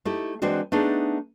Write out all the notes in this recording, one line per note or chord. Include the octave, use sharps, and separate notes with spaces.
A3 D#4 E4 G4
E3 G#3 C4 D4 F#4
A3 B3 D4 D#4 G#4